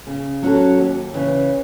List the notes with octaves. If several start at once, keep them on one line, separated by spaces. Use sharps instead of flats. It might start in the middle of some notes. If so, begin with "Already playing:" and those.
C#3
F#3 C#4 F#4 A4
D#2
C#3 E3